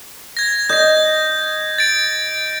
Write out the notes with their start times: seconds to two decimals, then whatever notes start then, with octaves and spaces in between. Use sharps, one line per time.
0.37 G#6 A#6
0.69 D#5 G6 A#6
1.78 A6 D7